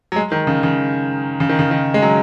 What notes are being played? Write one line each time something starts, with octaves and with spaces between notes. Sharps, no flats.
F#3
G#3
D#3
C#3
C#3
C#3
D#3
C#3
D#3
G#3
F#3